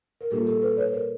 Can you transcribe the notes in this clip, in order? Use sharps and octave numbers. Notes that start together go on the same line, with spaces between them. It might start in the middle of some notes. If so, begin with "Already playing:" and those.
A#4
A#2 G3 A#3 D4 F4 G4 A4
G4 A4
A4 B4
B4 C#5
A#4 C5